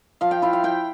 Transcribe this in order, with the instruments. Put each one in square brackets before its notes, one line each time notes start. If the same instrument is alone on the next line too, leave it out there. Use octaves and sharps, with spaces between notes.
[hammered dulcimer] F3 F5
G5
E4 F5
F5
E4 G5